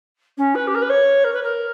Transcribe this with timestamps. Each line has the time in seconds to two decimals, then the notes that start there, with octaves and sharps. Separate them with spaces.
0.38 C#4
0.55 B4
0.67 G4
0.74 A#4
0.82 B4
0.89 C#5
1.24 A#4
1.33 B4
1.43 A#4